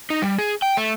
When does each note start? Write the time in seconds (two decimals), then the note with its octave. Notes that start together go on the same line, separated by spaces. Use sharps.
0.10 D#4
0.22 G3
0.38 G#4
0.62 G5
0.77 A3